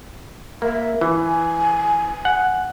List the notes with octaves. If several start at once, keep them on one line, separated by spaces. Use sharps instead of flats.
A#3 E5
E3 G#5
F#5